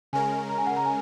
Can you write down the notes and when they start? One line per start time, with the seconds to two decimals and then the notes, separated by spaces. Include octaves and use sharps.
0.13 C#3 G#3 C#4 A#4 G#5
0.49 A#5
0.58 G#5
0.67 F#5
0.76 A#5
0.85 G#5